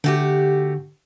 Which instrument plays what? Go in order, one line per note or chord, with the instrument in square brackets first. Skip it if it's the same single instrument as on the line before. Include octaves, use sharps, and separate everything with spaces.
[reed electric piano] D3 [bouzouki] A3 F#4 G4